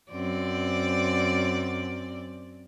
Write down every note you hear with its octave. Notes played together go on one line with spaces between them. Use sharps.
F#2 C4 D5